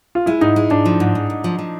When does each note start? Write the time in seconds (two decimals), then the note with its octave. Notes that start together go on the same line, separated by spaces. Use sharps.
0.15 F4
0.26 G#3 E4
0.41 G#2 D#4
0.56 G#3
0.70 G#2 D4
0.86 F3
1.00 G#2
1.15 G#2
1.30 G#2
1.44 F3
1.59 F3